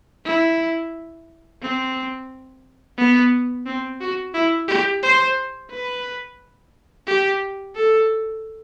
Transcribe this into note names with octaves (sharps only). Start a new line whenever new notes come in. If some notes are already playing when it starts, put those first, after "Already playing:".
E4
C4
B3
C4
F#4
E4
G4
C5
B4
G4
A4